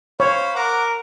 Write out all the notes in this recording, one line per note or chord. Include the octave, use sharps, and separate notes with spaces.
C5 C#5 F5 B5
A#4 F#5 A#5 D6